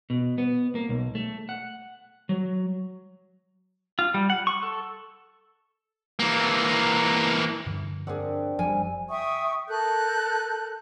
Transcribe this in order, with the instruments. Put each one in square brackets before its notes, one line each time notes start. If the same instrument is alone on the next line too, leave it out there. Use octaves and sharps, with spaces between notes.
[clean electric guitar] B2
B3
A#3
B1
A3
F#5
F#3
[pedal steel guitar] F4
G3
F#5
C#6
A4
[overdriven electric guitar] E3 A#3
[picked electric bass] G2 D3 F3
[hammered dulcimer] C4 D4 G4 [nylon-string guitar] G#4 A#4 F#5
[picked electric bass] F#1 [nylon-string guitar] F3 G3 [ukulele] G#5
[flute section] E5 G5 C#6 D#6
A4 A#4 F#6 G6